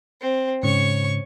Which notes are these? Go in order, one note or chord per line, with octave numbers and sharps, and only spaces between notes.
C4
G#2 C#3 C#5 C#6